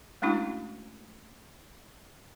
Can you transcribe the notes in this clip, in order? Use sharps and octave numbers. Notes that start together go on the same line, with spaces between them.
G#3 A3 C#4 D4 E4 F#4